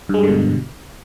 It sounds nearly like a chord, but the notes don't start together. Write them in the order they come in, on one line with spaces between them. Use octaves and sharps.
G2 G#3 G3 D3 B2